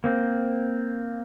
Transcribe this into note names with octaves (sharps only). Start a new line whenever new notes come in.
A#3 C4